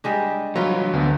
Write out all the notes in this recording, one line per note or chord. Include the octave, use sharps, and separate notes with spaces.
G3 G#3 D4
E3 F#3 G3 F4 B4
D2 D3 B3